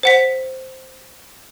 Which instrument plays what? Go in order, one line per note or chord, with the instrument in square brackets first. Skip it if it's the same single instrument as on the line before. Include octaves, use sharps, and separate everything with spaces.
[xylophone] C5 F#5 B6